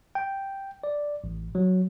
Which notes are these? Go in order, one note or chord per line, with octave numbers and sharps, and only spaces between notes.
G5
D5
A1
F#3